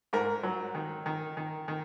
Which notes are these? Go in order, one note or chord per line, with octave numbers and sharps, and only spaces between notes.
G#2 A#4
F#3
D#3
D#3
D#3
D#3